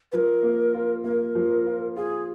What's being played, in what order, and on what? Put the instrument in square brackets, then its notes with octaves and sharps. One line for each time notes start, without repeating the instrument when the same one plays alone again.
[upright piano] F3 [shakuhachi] A#4 B4
[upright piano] A#3
F4
[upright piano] A#3 [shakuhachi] A#4
[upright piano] F3
F4
[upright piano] F4 [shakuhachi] G#4